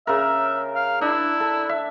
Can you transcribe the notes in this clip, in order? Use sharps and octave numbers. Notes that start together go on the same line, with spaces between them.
C#3 A#4 E5
F5
D4 E4
A4
E5